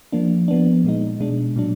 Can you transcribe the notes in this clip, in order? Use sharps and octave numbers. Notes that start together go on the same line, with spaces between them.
F3 A#3 D4
F3 B3 D4
A#2 G#3 D#4
B2 G#3 D4
A#2 F#3 D4